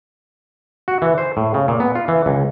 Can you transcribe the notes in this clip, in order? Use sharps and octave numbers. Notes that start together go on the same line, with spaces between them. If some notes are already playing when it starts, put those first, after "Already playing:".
F#4
E3
C5
A2
C#3
A#2
B3
F4
E3
C#2